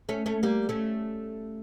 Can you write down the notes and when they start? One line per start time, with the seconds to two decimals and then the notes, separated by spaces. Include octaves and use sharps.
0.09 A3 C#4
0.26 A3 C#4
0.43 G3 A#3
0.69 A3 C#4